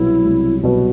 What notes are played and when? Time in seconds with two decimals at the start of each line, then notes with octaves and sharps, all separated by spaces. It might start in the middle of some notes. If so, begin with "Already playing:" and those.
Already playing: C2 B2 F#3 B3 E4 F#4
0.24 C2
0.63 B2 F#3 B3 F#4